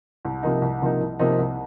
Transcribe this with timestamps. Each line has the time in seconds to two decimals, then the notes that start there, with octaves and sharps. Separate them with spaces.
0.25 C2
0.43 C3 F3 A#3 D#4
0.62 C2
0.82 C3 F3 A#3 D#4
1.00 C2
1.19 C3 F3 A#3 D#4
1.39 C2